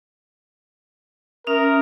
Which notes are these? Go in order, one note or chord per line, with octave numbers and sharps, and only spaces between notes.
C#4 A#4 E5 D#6